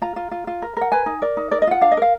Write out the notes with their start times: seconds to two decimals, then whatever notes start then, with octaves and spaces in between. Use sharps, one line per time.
0.02 F4 A#5
0.16 F4
0.31 F4
0.47 F4
0.62 A#4
0.77 A#4 F#5
0.92 B4 G#5
1.06 D#4
1.22 A#4 D5
1.37 D#4
1.51 A#4 D5
1.62 D#5
1.67 F4 F#5
1.81 D4 F5
1.91 D#5
1.97 A#4 F5